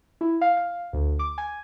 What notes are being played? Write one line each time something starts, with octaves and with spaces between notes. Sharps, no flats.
E4
F5
F5
D2
D6
G#5